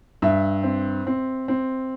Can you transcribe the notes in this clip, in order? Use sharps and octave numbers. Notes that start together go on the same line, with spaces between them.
G2 E5
C4
C4
C4